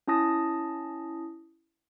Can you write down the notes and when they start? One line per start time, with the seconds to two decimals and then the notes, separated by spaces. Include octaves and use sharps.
0.07 C#4 E4 A5 D#6 A#6